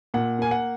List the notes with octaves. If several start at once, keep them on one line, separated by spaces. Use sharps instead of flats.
A#2 F#5
A#3 G#5
F#5